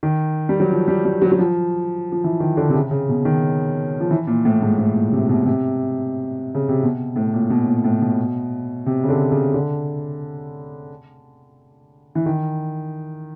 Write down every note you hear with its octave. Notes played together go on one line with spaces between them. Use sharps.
D#3
G3
F#3
F3
G3
G3
F#3
F#3
F3
F3
E3
D#3
D3
C3
C#3
C#3
B2
D#3
F3
E3
A#2
A2
G#2
A2
A#2
C3
B2
C3
C#3
C3
B2
A2
A#2
B2
A#2
A2
B2
C3
C#3
D3
C#3
D3
E3
D#3